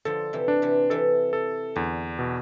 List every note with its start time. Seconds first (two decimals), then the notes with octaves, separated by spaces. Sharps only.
0.05 D3 F3 A4
0.33 C3 E3
0.48 D4
0.62 C3 E3
0.90 C3 E3 A4
1.33 A4
1.76 E2 D3
2.19 B2